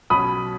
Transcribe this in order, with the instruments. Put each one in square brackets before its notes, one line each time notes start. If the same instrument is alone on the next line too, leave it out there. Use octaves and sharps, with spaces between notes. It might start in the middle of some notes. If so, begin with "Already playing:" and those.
[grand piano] B1 B2 F#3 C#4 B5 D#6